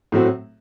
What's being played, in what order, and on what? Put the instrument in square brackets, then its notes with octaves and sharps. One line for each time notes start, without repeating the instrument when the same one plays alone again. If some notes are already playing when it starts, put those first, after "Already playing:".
[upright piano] A2 F#3 A3 C4 F#4